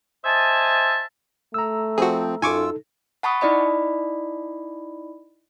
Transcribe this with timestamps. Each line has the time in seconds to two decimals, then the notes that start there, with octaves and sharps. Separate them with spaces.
0.24 C5 D#5 E5 G#5 A5
1.54 A3 A#5 E6
1.98 F3 C4 F#4 G#4
2.42 F#2 D#4 F4 A4 G#5 C#6 D6 E6
3.23 F#5 A5 B5 C#6 D#6
3.41 D#4 E4 D5 D#5 B5